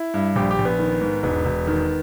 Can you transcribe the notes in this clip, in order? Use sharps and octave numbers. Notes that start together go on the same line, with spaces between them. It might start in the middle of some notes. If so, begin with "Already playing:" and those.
Already playing: E4
G2
A#1 G4
G4
A#1
B3
D#3
G#2
E1 B3
E1
D#3